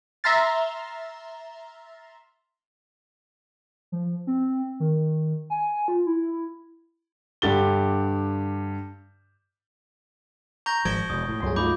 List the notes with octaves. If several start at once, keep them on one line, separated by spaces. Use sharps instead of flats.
E5 A#5 C6 F6 A6
F3
C4
D#3
G#5
F4
E4
G2 D3 G4 A6 G7
A#5 C#6 G6 A#6
G#1 F3 G#6 D7 G7
E1 D#6 G6
A2
C#2 G2 F#3 G#4 C#5 C6
A3 D#4 F4 B5 D6 G6